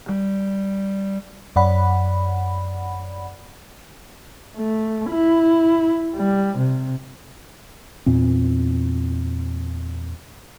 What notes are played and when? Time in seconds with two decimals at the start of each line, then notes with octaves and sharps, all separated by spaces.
0.09 G3
1.56 F#2 D5 F#5 B5
4.57 A3
5.10 E4
6.16 G3
6.58 C3
8.06 E2 A#2 C4